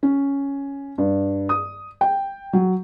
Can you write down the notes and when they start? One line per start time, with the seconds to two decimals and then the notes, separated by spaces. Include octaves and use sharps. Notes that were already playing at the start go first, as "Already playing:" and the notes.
0.03 C#4
0.98 G2
1.49 D#6
2.01 G5
2.53 F#3